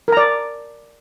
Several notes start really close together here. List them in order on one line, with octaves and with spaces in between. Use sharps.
A#4 A#5 D5